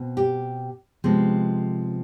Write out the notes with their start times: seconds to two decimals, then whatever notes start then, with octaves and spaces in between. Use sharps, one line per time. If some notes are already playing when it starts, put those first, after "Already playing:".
Already playing: B2 C4
0.17 G4
1.04 C3 F3 G#3 B3